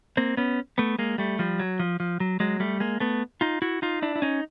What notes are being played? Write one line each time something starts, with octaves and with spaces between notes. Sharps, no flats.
A#3 C4
B3 C#4
A3 B3
G#3 A#3
G3 A3
F3 G3
F#3
F3
F3
F#3
F#3 G#3
G3 A3
G#3 A#3
A3 B3
D#4 F4
E4 F#4
D#4 F4
D4 E4
E4
C#4 D#4